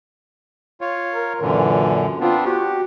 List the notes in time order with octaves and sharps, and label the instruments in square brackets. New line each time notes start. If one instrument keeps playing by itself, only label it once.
[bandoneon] F4 C#5
[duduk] A#4
[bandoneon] F#2 A#2 D3 [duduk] E3
[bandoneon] B3 C4 D4 [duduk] F4
[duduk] F#4 [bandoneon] G4